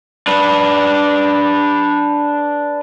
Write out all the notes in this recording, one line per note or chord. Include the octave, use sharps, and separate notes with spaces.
D4 B4